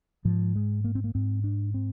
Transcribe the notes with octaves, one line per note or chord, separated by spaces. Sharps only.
G#2 F3
G#3
A#3
C4
A#3
G#2 C4
D4
C4